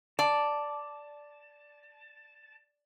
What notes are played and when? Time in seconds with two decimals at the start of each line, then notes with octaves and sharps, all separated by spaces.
0.19 D5 A5